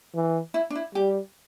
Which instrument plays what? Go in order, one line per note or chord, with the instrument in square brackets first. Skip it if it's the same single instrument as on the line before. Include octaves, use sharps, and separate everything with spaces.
[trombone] E3
[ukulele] E4
D4
E4
[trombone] G3 [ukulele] G4